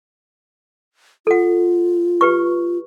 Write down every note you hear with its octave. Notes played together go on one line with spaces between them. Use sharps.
F4 A4 F#5
G4 B4 C#6